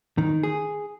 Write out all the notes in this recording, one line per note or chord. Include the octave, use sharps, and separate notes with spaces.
D#3
G#4